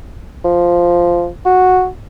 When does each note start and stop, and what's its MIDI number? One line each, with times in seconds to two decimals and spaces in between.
0.44 1.28 53
1.46 1.87 66